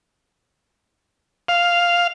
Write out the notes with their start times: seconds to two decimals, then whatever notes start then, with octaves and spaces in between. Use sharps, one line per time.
1.48 F5